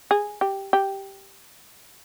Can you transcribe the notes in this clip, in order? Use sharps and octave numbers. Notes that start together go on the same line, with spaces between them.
G#4
G4
G4